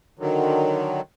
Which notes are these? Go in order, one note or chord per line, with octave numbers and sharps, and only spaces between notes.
D3 D#3 F#3